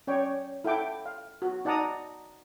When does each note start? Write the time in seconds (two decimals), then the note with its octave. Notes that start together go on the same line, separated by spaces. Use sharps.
0.07 C#4 C#5 D5 G5
0.64 E4 A4 F#5 G5 D6
1.06 F5
1.42 F#4
1.65 D#4 D5 F#5 A5 A#5 D#6